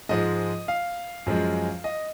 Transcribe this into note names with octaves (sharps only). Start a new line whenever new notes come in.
G#2 F3 G#3 D#5
F5
F#2 F3 G#3
D#5